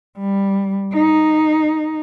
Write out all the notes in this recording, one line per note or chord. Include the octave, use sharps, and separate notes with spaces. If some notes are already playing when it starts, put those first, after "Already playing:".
G3
D#4